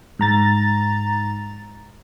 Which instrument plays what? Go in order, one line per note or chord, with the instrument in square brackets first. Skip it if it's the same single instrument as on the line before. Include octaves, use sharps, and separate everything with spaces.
[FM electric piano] G#2 A#5 A6